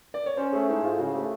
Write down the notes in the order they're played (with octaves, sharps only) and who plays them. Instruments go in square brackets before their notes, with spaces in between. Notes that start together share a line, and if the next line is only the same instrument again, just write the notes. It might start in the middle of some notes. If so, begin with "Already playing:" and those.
[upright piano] D5
C#5
[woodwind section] C#4 [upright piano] C5
[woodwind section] A3 [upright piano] G#4
[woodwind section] G#2 [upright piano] E4
[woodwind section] G#2 [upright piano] F4
[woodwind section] C#3 [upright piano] F#4
[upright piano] G#4
[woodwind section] A3 [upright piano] G4